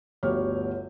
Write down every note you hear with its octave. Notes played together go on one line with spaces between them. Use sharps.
G1 D2 G4 C#5 F6